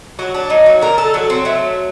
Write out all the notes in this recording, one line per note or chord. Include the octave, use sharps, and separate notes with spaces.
F#3 F#4
D4
F#3 D#4
F#4
D3 A#4
A4
F#3 F#4
C4
F#3 A3